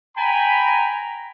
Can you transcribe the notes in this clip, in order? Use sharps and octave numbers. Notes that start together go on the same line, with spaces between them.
G5 G#5 A#5 B5